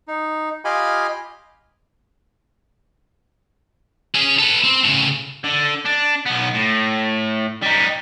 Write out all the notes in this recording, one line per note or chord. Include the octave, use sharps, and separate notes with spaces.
D#4
F4 G4 D#5 F5 G#5 B5
C#4 G#4
A4 B4
C4
A2 C#3
D3
D4
B1 B3
A2
G3 D#4